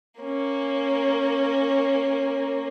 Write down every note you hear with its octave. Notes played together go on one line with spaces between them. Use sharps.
A#3 C#4